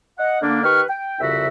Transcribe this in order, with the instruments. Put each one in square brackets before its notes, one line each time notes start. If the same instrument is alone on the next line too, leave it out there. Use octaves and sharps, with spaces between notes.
[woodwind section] D#5 F#5
D3 A#3 D4
D#3 G4 B4 C#6 F6
G5
C2 F2 C#3 F#4 E5